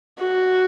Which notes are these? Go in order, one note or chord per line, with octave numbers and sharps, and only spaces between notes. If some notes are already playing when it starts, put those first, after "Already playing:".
F#4